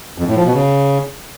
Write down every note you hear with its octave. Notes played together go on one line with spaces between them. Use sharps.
F2
A2
F3
B2
C#3